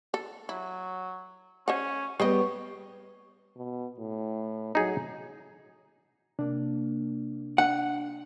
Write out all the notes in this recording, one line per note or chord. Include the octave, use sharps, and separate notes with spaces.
A4
F#3 E4
C#4 C5 D#5 F#5
G3 B3 G#4 C5 C#5 D#5
B2
A2
F#3 D#4 G#4
C3 A#3 D4
D4 F#5